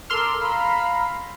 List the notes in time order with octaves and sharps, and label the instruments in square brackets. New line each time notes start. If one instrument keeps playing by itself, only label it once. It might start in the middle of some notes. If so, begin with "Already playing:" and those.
[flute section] A4 A#4 D6 [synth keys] C6 E6 F6
[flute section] F5 A#5 B5